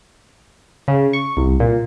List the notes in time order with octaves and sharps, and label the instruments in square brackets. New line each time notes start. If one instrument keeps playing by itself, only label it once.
[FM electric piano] C#3
C#6
C2
A#2